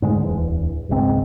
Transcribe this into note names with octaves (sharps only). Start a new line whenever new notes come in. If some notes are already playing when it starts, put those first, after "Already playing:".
G#2 D3 G#3
D1 E2
E1 C#2 G#2 C4